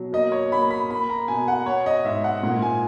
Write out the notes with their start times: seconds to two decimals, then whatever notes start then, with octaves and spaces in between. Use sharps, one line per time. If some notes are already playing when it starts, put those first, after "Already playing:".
Already playing: B2 F#3
0.13 A#3 D#5
0.32 C#5
0.52 A#3 B5
0.70 B5
0.90 A#3 B5
1.10 A#5
1.28 B2 G#5
1.48 F#5
1.66 B3 C#5
1.86 D#5
2.05 G#2 E5
2.24 F#5
2.43 A#2
2.62 G#5